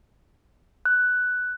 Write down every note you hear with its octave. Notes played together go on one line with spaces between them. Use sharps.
F#6